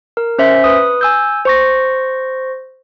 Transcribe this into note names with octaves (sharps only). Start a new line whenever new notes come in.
A#4
C#4 C5 E5
B4 D#6
G#5 E6 G6
C5 C#6 A#6